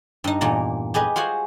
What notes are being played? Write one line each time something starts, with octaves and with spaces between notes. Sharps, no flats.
G2 D#4
E2 A#2 A#3 A#5
G4 G#4 B4 D#5
F4 F#4 G#4 C5 F#5